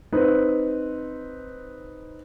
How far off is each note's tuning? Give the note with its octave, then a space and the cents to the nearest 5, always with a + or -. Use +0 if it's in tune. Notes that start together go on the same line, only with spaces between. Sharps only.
C4 +0 D#4 +0 B4 +0